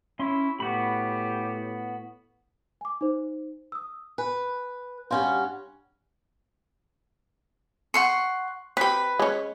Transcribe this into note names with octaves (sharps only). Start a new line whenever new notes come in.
C#4 E4 C6
A2 B3 F#4 G4 B5
G#5 D6
D#4 C5
D#6 E6
B4 G#5
G2 C#4 F#4 F5 C6 G6
F#5 C6 C#6
C4 G4 B4 B5
G#3 C#4